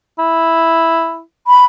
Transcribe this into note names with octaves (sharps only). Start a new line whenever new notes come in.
E4
B5